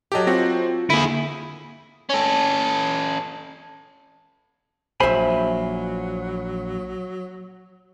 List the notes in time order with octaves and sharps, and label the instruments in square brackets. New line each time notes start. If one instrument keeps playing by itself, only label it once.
[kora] F#3 A4 G5 [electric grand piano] G4 D#5
[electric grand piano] C4 F#4 [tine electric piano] F4 A#6
[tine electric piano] D3 A#3 [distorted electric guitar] E4 G#4 [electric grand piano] D#7
[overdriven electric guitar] C#4 A4
[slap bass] A#1 A#2 [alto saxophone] F#3 [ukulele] C5 E5 [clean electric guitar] G#5 B5